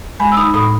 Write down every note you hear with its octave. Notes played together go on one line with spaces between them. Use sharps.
G#3 G#5 B5
E6
D#4 B5 D#6
A2 B5 D#6